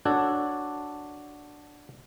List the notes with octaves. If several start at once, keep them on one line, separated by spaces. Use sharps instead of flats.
D4 F#4 A4 C#5